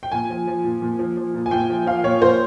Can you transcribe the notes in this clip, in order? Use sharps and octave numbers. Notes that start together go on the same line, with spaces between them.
G5
A#2 G#5
F3
F3
A#2
A#2
F3
F3
A#2
G#5
A#2 G5
F3
F3 F5
A#2 C#5
A#2 C5